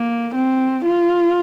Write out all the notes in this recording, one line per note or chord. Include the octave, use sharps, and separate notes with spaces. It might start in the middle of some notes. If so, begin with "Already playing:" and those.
Already playing: A#3
C4
F4